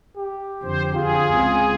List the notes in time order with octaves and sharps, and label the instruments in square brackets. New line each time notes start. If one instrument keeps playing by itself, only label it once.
[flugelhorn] G4
[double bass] F2 D3 [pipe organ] C5
[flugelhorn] F4 [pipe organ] G#4
[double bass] C#2 C4